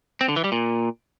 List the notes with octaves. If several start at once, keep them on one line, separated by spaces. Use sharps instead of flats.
C4
D3
E3
G3
A#2